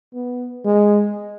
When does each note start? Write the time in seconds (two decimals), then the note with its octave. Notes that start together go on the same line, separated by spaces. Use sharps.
0.14 B3
0.65 G#3